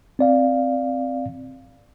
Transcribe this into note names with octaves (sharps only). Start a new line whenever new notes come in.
C4 D5 F5